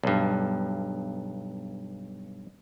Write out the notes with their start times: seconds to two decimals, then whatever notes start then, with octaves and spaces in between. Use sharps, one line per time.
0.03 B1 G2